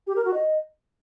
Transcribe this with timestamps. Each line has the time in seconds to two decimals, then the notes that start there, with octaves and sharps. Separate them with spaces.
0.07 G4
0.16 A#4
0.25 F#4
0.34 D#5